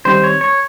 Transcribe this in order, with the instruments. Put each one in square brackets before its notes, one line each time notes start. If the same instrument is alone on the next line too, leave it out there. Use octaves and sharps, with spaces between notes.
[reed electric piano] D#3 G3 C4 D#4 G4 [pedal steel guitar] C5
[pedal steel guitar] C#5
C#5